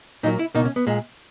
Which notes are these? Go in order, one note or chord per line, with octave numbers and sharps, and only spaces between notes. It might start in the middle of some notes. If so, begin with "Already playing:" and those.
A#2 F#3 A#3 D#4
E4
C#2 B2 A#3 D#4
C#4
B3
A#2 G#3